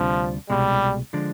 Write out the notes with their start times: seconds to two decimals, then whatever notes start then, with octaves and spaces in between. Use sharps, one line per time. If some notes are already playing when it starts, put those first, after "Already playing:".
Already playing: D2 C3 F3 G3 D4 F4
0.50 C2 B2 G3 G#3
1.13 D3 F3 G#3 D4